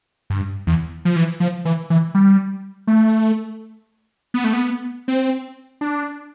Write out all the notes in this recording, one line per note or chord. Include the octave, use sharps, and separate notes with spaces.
G2
E2
F3
E3
F3
E3
E3
G3
A3
B3
A3
B3
C4
D4